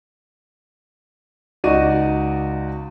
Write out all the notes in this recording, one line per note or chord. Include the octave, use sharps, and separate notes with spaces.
C#2 D#4 F#4 D5 D#5 D#7